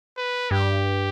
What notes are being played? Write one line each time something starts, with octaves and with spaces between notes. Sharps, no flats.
B4
G2 G4